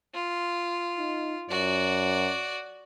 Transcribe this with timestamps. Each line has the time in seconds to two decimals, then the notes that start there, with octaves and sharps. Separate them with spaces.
0.14 F4
0.98 D#4
1.50 F#2 F#4 D5